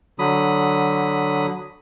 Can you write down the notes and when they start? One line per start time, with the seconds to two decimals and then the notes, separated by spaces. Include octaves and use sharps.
0.19 D3 F#3 B5 D#6